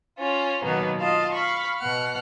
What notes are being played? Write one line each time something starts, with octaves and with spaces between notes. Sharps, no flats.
C#4 F4
B2 D#3 F#3 A#3 B3
F4 D#5 F5 A5
F5 B5 C#6
B2 F#5 F6